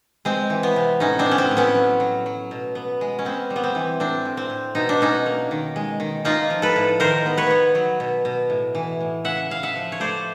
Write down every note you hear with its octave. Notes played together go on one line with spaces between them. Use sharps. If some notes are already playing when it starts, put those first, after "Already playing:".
G#3 C4
E3
B3
C3
A2 C#4 D#4
C4 D4
B3
C#4
C4
A2
B3 C#4
F#3
F#3
F#3
B2
B3
G#3
C#4
B3 C4
G3
B3
C4
E3
A2 C4 D4
A2
C4
A2
B2 D#4
D4
B2 C#4 D#4
A#3
D#3
G#3
D#3
A#3 D#4 F4
F3
A4 B4
A2
D#3 A#4 C5
B3
B4 C#5
B3
F#3
B2
B2
A2
E3
A2
C#3 E5 F#5
C#3 F5
E5 F#5
F3
C#5
A3 C5 D5